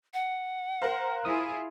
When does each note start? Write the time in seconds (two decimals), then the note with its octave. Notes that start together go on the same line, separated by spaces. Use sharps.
0.14 F#5
0.82 A#4 C5 F5 A#5 F#6
1.25 E4 F4 G#4 D#6